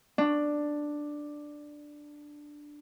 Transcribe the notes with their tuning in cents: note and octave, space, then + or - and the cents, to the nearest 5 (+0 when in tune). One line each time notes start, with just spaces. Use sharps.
D4 +5